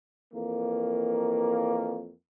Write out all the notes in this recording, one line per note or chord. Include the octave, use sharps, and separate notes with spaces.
F2 E3 A#3